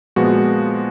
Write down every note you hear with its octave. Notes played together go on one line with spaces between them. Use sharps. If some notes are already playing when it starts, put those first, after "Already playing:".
A#2 F3 G#3 B3 F#4